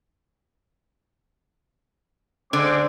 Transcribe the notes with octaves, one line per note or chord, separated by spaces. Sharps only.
D3 G#3 C4 D6